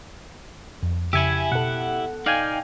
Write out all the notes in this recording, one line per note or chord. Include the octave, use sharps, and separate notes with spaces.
F2
F2 C#3 E4 G4 E5 G#5 C#7
B2 A4 F#5
D#4 D5 F5 G5 G#5